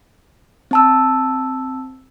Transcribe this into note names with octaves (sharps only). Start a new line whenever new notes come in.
C4 A5 E6